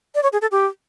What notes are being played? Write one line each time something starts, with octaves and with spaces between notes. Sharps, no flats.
D5
C#5
G#4
A4
G4